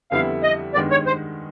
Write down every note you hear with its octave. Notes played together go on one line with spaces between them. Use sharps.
F2 D3 G3 B3 E4 F5
D#5
G2 D#3 G#3 B3 D5
C#5
C5